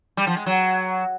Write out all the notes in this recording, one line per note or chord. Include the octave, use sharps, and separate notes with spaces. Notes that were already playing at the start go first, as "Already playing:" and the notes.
G3
F3
G#3
F#3